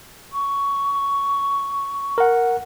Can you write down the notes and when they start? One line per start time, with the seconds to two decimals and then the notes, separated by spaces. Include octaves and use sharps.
0.32 C#6
2.18 A#4 F#5